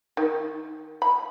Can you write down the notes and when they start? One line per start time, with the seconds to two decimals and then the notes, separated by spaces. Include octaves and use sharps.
0.17 D#3
1.02 B5